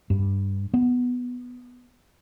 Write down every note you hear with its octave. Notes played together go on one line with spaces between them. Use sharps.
G2
B3